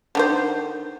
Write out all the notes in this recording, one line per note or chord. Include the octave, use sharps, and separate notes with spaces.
D3 D#3 C5